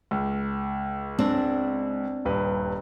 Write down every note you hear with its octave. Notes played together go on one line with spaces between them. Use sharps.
C#2
C4 D4
D#1 G2 B4